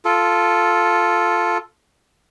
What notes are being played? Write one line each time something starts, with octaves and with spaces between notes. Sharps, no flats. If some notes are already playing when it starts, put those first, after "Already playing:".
F4 A4